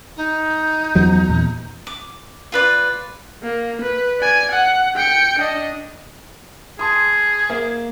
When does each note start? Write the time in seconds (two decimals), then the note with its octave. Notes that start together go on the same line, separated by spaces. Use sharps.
0.17 D#4
0.95 E2 F3 F#3
1.29 E2 A#2
1.87 D6
2.52 F4 B4 D5
3.43 A#3
3.82 B4
4.20 D5 G#5
4.52 F#5
4.96 G5 C#7
5.39 D4 D#5
6.79 G#4 A5 C6 D#6
7.50 A#3